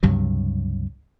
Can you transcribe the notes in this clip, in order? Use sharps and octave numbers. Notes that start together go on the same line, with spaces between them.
C#2 G2 C3 F#3